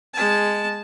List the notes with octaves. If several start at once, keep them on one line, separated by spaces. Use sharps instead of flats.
G#3 A5